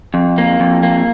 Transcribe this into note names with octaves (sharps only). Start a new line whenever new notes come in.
F2
A#3
F2
A#3